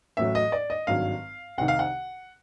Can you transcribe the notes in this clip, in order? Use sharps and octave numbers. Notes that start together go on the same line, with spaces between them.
A1 A2 F#3 E5
D#5
D5
D#5
G#1 G2 D#3 F#3 F5
C2 C3 D#3 F#5
F5
F#5